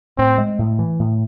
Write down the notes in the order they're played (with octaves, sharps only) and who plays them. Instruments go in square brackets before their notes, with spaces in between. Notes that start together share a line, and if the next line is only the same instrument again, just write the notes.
[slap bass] A2 [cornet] C4
[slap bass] G#3
A2
E3
A2